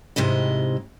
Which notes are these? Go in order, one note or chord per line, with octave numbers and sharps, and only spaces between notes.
G#2 C3 E4 D#5